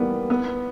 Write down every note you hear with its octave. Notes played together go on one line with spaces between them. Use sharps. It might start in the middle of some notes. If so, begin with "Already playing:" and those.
Already playing: E3 G3 A#3 B3
B3